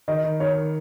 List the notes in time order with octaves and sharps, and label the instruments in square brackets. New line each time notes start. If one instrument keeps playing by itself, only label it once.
[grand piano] D#3 [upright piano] D#5
[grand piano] D#3
[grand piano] D#3 [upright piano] C#5
[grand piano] D#3